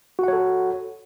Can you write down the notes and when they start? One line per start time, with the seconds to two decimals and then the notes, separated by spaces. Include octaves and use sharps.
0.19 F#4
0.23 F#5
0.28 C#5
0.33 A4